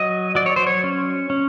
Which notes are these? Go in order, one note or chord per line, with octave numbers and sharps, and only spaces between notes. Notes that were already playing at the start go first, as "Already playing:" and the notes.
Already playing: F#3 D#5
F#3 D5
C#5
C5
C#5
C#4
C#4